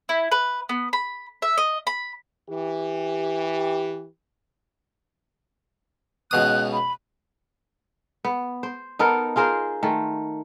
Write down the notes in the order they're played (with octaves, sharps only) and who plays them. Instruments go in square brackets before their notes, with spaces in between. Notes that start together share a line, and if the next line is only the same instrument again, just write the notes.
[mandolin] E4
B4
B3
B5
E5
D#5
B5
[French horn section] E3 G4
[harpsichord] C#2 B2 D#6 [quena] F#6
[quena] B5
[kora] B3
C5
B3 D#4 A4 A#4
F4 G#4 A#4 C5
D#3 A3